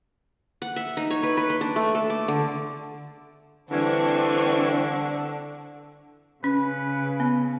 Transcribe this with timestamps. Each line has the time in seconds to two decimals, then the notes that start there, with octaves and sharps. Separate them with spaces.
0.62 F#5
0.76 E5
0.97 D#4
1.10 C#5
1.23 B4
1.37 B4
1.50 C6
1.61 D4
1.76 A3
1.95 A4
2.10 D6
2.28 D3
3.71 D3 E3 G3 C4 D4 C#6
6.44 C#3 C#4 B4
7.20 B3